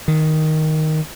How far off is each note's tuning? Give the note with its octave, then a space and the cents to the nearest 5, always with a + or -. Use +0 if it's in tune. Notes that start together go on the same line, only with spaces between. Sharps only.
D#3 +5